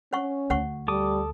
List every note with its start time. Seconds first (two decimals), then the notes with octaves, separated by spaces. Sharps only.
0.13 C#4 C5 F#5 C#6
0.50 D2 C5 F#5 C#6
0.88 G3 A4 D6 D#6